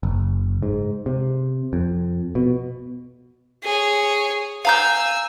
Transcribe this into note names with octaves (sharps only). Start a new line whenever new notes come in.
F#1
G#2
C3
F2
B2
G#4 C#5
F5 G#5 A#5 E6 G6